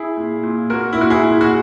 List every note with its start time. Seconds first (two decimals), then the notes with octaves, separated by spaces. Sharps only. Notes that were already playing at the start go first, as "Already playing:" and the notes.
Already playing: E4 G#4
0.17 A#2
0.43 A#2
0.70 A#2 F#4 A#4
0.93 E4
0.97 A#2 F#4
1.10 E4 G#4
1.23 A#2
1.41 F#4